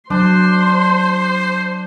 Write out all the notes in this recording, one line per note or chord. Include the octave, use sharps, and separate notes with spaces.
F#3 D4 C5 C6